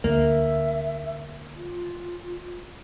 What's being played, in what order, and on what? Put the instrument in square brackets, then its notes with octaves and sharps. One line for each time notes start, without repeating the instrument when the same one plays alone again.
[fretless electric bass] D2 [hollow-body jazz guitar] A#3 [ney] E5
[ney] F4